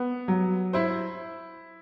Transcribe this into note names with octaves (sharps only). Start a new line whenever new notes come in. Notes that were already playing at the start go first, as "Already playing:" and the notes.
Already playing: B3
F#3
E4 C5